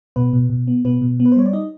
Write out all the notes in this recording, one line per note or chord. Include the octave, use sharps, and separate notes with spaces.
B2 B3 B4
B2
B2
B3
B2 B3 B4
B2
B3
B4
C5
G3 C#5
D5
D#4 D#5